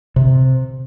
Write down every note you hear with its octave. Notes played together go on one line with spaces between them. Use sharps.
C3